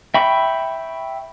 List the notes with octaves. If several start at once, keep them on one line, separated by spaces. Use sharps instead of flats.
E5 G5 B5 C#6